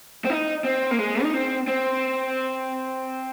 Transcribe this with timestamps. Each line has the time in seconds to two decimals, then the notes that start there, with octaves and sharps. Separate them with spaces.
0.25 C4
0.30 D#4
0.64 C4
0.91 A#3
0.99 G#3
1.23 D#4
1.34 C4
1.68 C4